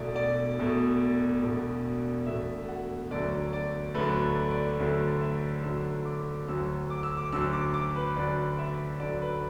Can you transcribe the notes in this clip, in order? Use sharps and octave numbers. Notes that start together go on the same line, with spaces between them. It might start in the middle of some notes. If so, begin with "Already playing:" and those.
Already playing: E1 E2 B2 A3 D5
D5
E1 E2 B2 A3
E1 E2 B2 A3
E1 E2 B2 A3 E5
F#5
D2 D3 F#3 A3 D5
D5
D2 D3 F#3 A3 B4
D5
D2 D3 F#3 A3
E5
D2 D3 F#3 A3 E6
D6
D2 D3 F#3 E6
D6
E6
D6
D2 D3 F#3 E6
D6
D6
B4
D2 D3 F#3 D5
E5
D2 D3 F#3 D5
B4